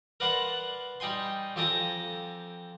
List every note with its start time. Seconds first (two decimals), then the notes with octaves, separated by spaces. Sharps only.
0.20 A#4 B4 D5 F#5 A5 C6
1.00 G3 D#4 G5 G#5 C6
1.56 F2 G4 A4 G#5 A#5 D6